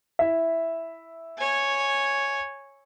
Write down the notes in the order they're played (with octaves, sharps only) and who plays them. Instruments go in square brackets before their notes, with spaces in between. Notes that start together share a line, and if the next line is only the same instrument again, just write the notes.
[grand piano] E4 E5
[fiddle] C#5 G#5